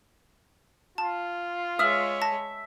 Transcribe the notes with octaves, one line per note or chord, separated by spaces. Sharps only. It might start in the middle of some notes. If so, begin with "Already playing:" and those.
F4 A5
G#3 C#5 E5 D#6 F6 F#7
A5 A#6